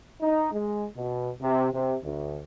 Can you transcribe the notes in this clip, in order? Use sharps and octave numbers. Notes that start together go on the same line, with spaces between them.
D#4
G#3
B2
C3
C3
D2